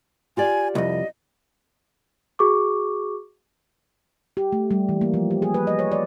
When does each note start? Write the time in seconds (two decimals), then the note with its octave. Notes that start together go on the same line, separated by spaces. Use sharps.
0.37 F4 G4 D5 G#5
0.75 C2 F2 D#5
2.39 F#4 G#4 C#6 D6
4.37 G4
4.52 A3
4.71 G3
4.89 E3
5.01 A#3
5.14 F3
5.31 G4
5.42 G#4
5.54 B4
5.67 D#5
5.79 C#5
5.92 D5